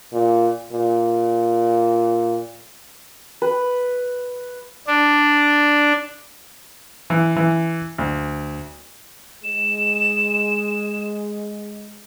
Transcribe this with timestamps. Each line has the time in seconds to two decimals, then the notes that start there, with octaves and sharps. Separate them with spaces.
0.13 A#2
0.72 A#2
3.42 B4
4.87 D4
7.10 E3
7.36 E3
7.98 D2
9.44 G#3 E7